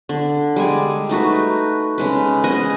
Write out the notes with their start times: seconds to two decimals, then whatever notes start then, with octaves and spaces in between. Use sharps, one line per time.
0.09 D3
0.56 G3 G#3 G#5
1.09 A3 D#4 F#4 B4
1.98 C#3 G#3 B4
2.44 D#5 F#5 G#5